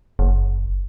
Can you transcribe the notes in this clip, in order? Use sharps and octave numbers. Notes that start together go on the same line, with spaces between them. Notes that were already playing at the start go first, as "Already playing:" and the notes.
F#1